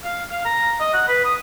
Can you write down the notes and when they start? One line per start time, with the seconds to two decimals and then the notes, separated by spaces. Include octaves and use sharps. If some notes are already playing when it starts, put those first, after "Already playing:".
0.04 F5
0.31 F5
0.45 A#5
0.80 D#5
0.93 F#5
1.08 B4
1.25 D#6